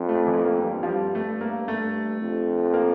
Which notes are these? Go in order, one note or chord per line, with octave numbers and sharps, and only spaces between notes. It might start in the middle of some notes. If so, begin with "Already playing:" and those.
Already playing: F2
A3
E3
A#3
G2 G3
F3
G3
A3
A#3
A3
F2
A#3